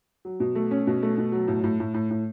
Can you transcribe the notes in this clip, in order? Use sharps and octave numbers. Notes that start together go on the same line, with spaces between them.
F#3
B2
A3
C#4
B2
A3
B2
F#3
A2
A2
A2
A2
A2